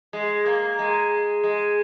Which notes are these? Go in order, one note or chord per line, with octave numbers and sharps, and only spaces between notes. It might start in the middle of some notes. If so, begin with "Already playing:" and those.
G#3
A#3
G#3
G#3